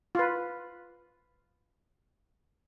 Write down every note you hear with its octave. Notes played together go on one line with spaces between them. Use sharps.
F4 B4